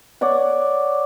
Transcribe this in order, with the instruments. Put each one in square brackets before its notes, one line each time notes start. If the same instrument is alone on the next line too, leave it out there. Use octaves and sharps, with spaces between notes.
[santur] C#5 D5 F#5